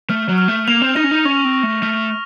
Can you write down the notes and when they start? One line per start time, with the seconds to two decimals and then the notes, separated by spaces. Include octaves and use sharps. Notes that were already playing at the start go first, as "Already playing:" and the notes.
0.10 A3 F6
0.29 F#3
0.38 F6
0.48 A3
0.68 A#3 F7
0.82 C4
0.96 D#4 A#6
1.04 C#4
1.11 D#4
1.25 C#4 C#6
1.45 C4
1.54 C#6
1.63 A3
1.83 A3 F6